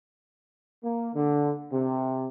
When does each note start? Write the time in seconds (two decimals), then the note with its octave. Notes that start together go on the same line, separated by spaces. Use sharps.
0.83 A#3
1.14 D3
1.72 C3